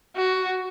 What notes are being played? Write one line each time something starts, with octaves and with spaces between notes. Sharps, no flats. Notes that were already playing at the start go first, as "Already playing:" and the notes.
F#4